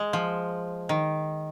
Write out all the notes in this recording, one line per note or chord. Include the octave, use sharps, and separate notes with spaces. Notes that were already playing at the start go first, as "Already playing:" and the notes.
Already playing: G#3
F3
D#3